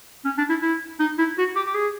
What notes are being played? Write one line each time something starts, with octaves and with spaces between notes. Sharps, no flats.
C#4
D4
E4
E4
D#4
E4
F#4
G4
G4
G#4